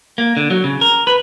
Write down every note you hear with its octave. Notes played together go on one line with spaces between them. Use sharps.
A#3
D3
F#3
C#3
A#4
B4